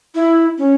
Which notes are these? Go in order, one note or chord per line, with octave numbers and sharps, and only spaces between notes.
E4
C#4